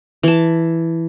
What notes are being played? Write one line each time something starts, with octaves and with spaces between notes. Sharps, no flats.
E3 A5